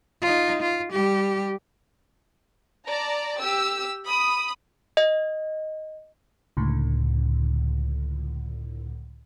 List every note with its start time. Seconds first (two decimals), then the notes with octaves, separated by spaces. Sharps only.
0.22 D#4 F4
0.62 F4
0.92 G3 G4
2.86 D5 A5 A#5
3.40 G4 E6
4.08 B5 D#6
4.97 D#5
6.57 C#2 A2 D3